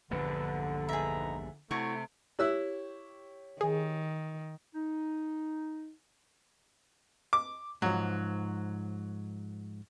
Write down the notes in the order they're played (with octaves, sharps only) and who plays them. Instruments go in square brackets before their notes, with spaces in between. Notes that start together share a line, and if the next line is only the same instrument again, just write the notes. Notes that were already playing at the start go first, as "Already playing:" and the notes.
[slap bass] A#1 E2 G2 [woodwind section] D3 [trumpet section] B4
[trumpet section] D#4 B4 A#5 [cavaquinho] G#4 E5
[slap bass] C3 [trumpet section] A3 [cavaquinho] E4 F#4 C#5
[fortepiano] E4 E6 F#6 [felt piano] G4 C#5
[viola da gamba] D#3 [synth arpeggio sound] G#4
[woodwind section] D#4
[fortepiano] D6
[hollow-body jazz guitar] G#2 F3 [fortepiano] F#3